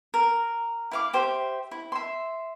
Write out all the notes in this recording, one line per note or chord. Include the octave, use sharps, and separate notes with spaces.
A#4
E4 F5 D6
G4 C5 E5
E4
E5 C6